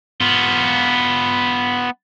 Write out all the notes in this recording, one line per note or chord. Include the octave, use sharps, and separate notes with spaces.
B3 F4